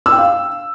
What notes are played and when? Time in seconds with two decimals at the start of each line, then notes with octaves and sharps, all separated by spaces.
0.06 E6
0.12 G5
0.18 F5